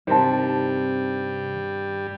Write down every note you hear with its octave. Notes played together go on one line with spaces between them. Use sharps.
G2 C3 D#3 G3 C5 A5